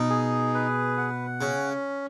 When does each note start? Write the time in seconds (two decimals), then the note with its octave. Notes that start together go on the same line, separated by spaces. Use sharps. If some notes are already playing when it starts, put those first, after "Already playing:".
Already playing: B2 D#4
0.10 G#4
0.54 B4
0.98 F#5
1.41 C#3 C#4